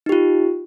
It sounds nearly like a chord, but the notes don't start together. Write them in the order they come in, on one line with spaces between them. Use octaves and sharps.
D#4 G4 F4